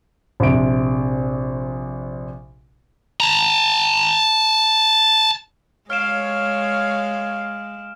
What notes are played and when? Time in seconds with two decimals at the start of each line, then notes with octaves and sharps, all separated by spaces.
0.40 A#1 C3 D7
3.20 A5 A#5
5.90 G#3 C#5 F5 F6 D7 E7